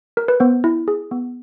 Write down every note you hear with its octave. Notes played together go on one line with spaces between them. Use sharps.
A#4
B4
B3 C5
E4
G#4
B3